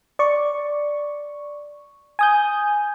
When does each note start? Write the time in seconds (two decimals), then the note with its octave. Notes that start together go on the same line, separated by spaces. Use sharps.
0.19 D5 C#6
2.19 G#5 D#6 G6